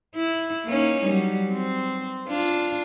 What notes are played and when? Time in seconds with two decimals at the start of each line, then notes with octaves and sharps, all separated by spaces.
0.15 E4
0.66 A#3 C#4 D#4
1.06 F#3 G3
1.52 C4
2.29 D4 F4